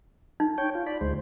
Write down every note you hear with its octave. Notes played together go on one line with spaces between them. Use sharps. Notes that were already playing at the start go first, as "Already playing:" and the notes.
D#4
C#5 G5
F4
D5 B5
D2 G#3 C5